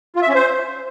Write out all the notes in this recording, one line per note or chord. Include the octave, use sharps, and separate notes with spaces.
F4
E5
C#4
C5